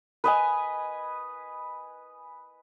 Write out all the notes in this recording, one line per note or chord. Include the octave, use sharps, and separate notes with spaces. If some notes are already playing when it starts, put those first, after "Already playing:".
B4 D#5 G#5